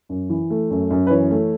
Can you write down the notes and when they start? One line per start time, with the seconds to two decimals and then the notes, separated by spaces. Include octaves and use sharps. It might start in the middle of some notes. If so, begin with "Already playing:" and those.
0.09 F#2
0.30 E3
0.50 A3
0.71 F#2
0.90 F#2
1.07 B4
1.11 E3 C#5
1.31 A3